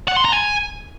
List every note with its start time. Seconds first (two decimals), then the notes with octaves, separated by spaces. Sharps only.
0.08 F#5
0.16 C6
0.25 A#5
0.33 G#5